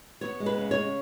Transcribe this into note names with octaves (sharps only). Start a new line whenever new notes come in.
B3 C#5
G#3
B4
C#3
C#5
C#3